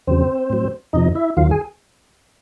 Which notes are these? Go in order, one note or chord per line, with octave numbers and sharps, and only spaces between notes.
E2 C#3 F#3 C4 C5
A2 F#3
F2 C3 F3 D#4 D#5
E4 E5
D#2 D#3 F#3 F4 F5
G#4 G#5